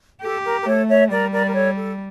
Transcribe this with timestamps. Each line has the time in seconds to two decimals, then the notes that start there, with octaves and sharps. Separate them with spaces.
0.22 G4 A4
0.44 A#4
0.60 A#4
0.66 A3 A4 C#5
0.88 C#5 E5
1.09 G3 A#4 D5
1.32 A#4 D5
1.46 A#4
1.54 A4 C#5
1.76 A4